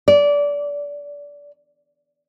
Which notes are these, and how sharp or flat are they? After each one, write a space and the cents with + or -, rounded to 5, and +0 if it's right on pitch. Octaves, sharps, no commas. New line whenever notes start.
D5 -20